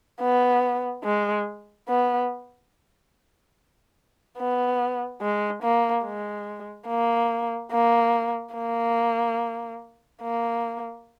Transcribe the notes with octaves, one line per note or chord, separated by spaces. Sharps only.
B3
G#3
B3
B3
G#3
A#3
G#3
A#3
A#3
A#3
A#3